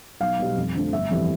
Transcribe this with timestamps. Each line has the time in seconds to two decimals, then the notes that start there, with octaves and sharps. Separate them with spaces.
0.20 B1 F5
0.39 B2 G3
0.57 F2
0.75 D3 F3 A3
0.92 G1 E5
1.10 F2 E3 G3